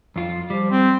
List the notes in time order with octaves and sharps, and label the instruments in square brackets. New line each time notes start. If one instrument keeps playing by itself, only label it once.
[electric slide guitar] F2 F4
[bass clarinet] F3 [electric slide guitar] G3
[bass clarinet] C4